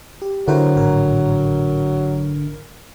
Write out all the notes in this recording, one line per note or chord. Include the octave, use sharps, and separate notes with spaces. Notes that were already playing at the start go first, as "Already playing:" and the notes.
G4
D3 F#3 E4 A#4 C5
G#1 A2 A#4